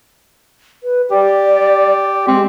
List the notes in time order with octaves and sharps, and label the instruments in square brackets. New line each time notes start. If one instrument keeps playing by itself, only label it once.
[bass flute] B4
[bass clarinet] G4 [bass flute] D5
[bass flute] G#3 [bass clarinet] C4